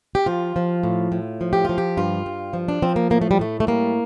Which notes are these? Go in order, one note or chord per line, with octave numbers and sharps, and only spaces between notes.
G4
F3 F4
F3
A2
A2
F3
G4
F3 F4
G4
G2 F4
G2
F3
D4
F3 C4
A#3
A2 A#3
A3
G3
A2 A3
A3
G3 A#3